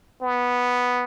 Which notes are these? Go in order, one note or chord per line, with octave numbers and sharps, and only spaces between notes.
B3